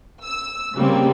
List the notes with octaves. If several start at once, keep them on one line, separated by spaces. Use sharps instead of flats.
E6
C#3 G3 A#3 C4